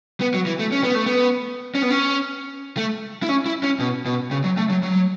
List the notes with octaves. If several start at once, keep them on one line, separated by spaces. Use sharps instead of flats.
B3
F#3
E3
A3
C#4
B3
A3
B3
C#4
B3
C#4
A3
E4
C#4
E4
C#4
B2
B2
C#3
F#3
A3
F#3
F#3